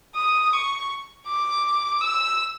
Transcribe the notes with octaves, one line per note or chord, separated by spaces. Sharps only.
D#6
C#6
D6
E6